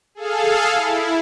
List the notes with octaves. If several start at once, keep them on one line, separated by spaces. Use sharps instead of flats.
G#4 A4 F5
E4